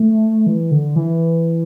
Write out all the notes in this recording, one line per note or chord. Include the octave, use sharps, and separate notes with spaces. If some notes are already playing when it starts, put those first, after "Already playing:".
Already playing: A3
E3
D3
E3